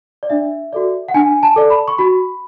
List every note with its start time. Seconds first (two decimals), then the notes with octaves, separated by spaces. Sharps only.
0.23 D5
0.30 D4 E5
0.73 F#4 A4 D5
1.08 F#5
1.14 D4 G#5
1.43 A5
1.56 A4 D5
1.70 B5
1.88 C#6
1.98 F#4 B5